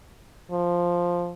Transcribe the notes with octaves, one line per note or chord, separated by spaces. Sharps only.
F3